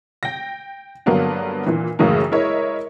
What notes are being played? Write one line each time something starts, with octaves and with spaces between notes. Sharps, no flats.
G5 A#6
G2 D3 F#3 A#3 B3 D4
A#2 E3
F#2 A2 C#3 E3 G#3 A#3
G#3 E4 A#4 C#5 D#5 E5